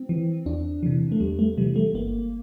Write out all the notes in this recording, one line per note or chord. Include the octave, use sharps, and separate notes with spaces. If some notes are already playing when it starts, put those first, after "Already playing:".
Already playing: C4
E3
E2 D4
C3 E3
A3
E2 G3
A3
C3 E3 G3
A3
G1 A#3